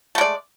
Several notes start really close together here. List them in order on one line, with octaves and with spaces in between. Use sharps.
A3 G#3 D5